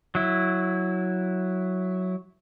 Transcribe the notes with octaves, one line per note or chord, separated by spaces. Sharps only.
F#3 E4